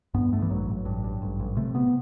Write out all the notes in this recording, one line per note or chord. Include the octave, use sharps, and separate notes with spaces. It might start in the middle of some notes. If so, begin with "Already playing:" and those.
G2 B3
G2 A3
E3
A1 F#3
A1
G2
G2
A1
A1
C3 A3
C3 B3